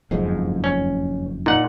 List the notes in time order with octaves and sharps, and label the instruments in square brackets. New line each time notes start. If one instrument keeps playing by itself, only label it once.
[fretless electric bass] F#1 F2 G#2
[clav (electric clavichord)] C#4
[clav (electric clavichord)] A#2 F#5 [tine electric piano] D#4